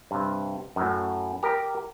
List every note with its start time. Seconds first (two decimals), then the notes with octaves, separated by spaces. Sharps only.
0.11 G2 C3
0.76 F#2 A2
1.43 G4 A#4